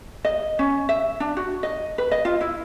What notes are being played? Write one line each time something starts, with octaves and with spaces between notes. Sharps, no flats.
D#5
C#4
E5
D4
F#4
D#5
B4
D#5
F4
E4